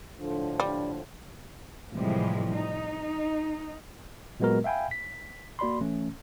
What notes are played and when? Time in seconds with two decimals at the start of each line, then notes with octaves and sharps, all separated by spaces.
0.17 A2 D3 F3 D4 F4
0.60 G3
1.94 A2 C3 E3 F3 G3 G#3
2.53 D#4
4.40 A#2 F#3 G#3 B3 F#4 A#4
4.64 E5 F5 G5 G#5 B5
4.91 B6
5.59 A#3 F#4 D5 B5 C6
5.81 E3 A3 C#4